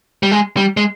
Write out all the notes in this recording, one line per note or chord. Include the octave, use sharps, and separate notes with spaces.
G3
G#3
G3
G#3